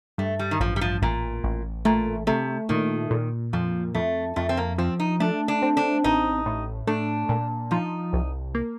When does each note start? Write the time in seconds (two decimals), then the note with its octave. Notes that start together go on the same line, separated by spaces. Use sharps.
0.18 G2 A3
0.39 G3
0.51 D#3
0.60 A1 F3
0.76 G3
0.81 F3
1.02 A1 A#2
1.44 A1
1.85 A#2 A3
2.27 C3 A3
2.69 A#2 D#3
3.11 A#2
3.53 F2 F3
3.95 F2 A3
4.36 F2 A3
4.49 C4
4.57 A#3
4.78 F3 C4
5.00 D#4
5.20 A3 D4
5.48 D4
5.62 C4
5.77 D4
6.04 A1 D#4
6.46 A2
6.87 A3 D4
7.29 A#2
7.71 F3 D#4
8.13 C2
8.55 A#3